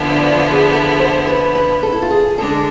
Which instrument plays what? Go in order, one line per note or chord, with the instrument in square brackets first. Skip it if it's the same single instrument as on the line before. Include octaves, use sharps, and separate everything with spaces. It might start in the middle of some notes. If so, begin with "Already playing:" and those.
Already playing: [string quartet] D3 F3 B3 E4
[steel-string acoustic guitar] D4
F4
G#4
A4
C5
B4
B4
A4
E4
F4
G#4
[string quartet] D3 G#3 D4 [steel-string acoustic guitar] A4